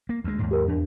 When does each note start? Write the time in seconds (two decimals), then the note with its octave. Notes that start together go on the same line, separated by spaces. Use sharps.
0.09 A#3
0.24 D2 G#3
0.39 D#2 G#2
0.51 G4 A#4
0.68 E2 D4